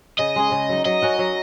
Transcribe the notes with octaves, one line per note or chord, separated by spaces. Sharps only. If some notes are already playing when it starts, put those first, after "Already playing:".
C#3 D#5
G#3 C#4 G#4
C#3
F#3 D#4
F#3 D#5
C#4 F#4 A#4
F#3